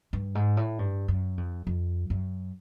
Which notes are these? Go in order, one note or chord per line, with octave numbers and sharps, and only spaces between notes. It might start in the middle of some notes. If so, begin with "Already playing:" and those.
G2
G#2
A2
G2
F#2
F2
F2
F#2